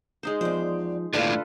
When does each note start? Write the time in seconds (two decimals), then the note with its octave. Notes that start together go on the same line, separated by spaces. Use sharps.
0.23 G#3 D#4 C5
0.41 E2 F3 C5 D5
1.13 D#2 A2 D3 D4 E4 F4 A4 B4